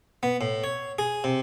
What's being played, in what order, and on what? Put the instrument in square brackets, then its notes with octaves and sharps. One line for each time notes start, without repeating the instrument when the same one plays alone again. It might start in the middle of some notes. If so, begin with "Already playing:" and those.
[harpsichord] B3
A2
C#5
G#4
C3